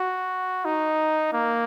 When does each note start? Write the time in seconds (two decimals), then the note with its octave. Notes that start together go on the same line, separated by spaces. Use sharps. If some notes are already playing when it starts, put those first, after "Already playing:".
Already playing: F#4
0.65 D#4
1.33 A#3